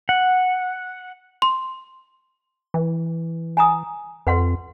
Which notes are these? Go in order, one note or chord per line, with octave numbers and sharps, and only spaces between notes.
F#5
C6
E3
G#5 A#5 D#6
F2 B4 F#5 C6